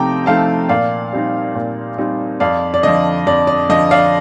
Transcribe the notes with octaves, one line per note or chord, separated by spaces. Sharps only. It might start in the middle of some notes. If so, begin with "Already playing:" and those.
Already playing: C3 F3 A3 C4 D#4 G5 A#5 D6
F3 A3 C4 D#4 F5 A5
A#2 D5 F5
G3 C4 D#4
A#2
G3 C4 D#4
F2 D5 F5
D5
D3 F3 D#5
F2 D5
D5
D3 F3 D#5
D5 F5